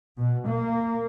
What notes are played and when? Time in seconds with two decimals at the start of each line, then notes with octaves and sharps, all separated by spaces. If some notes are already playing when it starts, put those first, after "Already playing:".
0.18 B2
0.48 A#3